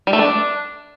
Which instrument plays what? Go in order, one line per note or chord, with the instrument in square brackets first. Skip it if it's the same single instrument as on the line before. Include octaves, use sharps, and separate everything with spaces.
[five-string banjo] G3
A3
D4